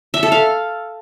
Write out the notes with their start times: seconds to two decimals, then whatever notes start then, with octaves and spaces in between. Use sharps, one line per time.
0.14 E5
0.23 A4
0.32 F5